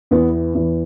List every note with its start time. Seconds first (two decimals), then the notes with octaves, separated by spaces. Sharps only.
0.11 E2 E3 B3
0.55 E2 E3